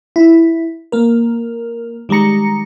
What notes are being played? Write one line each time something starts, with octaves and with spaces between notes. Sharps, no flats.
E4
A#3 A#4
D#3 G3 G#3 A#5 C#7